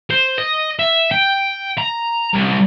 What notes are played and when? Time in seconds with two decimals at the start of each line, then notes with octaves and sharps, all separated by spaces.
0.10 C5
0.38 D#5
0.79 E5
1.12 G5
1.78 A#5
2.34 C2